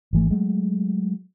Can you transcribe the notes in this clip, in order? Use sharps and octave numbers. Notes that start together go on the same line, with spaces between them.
G#1 E3 A3
F#3 G#3 A3